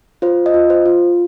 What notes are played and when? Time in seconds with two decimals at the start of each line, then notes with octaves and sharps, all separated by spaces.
0.22 F4 C5
0.46 D#5
0.54 F4
0.70 C5
0.86 F4